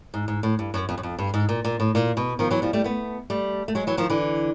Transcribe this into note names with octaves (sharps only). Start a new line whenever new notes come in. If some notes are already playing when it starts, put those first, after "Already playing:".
G#2
G#2
A2
G2
F#2
F2
F#2
F2
G2
G#2
A#2
A#2
A2
A#2
B2
D#3 F3
E3 F#3
F3 G3
G3 A3
A3 B3
G3 A3
A3
F#3 G#3
E3 F#3
D#3 F3
D3 E3